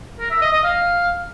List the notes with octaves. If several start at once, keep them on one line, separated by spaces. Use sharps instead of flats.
A#4
E5
D#5
D#5
F5